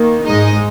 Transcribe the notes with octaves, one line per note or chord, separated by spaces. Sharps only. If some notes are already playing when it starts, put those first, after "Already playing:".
Already playing: D#3 A#3
G#2 G#3 D#4 D#5